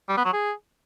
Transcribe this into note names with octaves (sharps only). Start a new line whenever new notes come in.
G3
B3
F#3
G#4